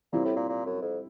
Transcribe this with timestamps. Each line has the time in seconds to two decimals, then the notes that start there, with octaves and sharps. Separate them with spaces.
0.13 A#2 G3 C4 E4
0.25 A2
0.37 A#2
0.49 A#2
0.66 F#2
0.82 F2